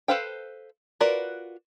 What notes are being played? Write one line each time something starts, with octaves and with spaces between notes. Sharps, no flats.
A4 B4 C5 F5 G5
F4 F#4 A#4 B4 D5